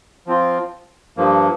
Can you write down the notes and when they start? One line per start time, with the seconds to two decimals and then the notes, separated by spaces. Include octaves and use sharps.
0.26 F3 C4 F4
1.17 G2 F3 A#3